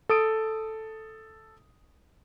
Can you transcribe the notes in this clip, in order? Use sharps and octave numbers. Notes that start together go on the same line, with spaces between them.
A4 D#6 D7